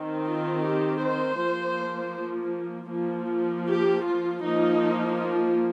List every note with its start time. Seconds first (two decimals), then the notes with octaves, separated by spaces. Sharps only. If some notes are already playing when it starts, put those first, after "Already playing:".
Already playing: D#3 C4
0.26 F4
0.63 G4
1.01 C5
1.39 F3 A#3
2.91 F3 A#3
3.67 G4
4.04 F4
4.43 F3 A#3 D#4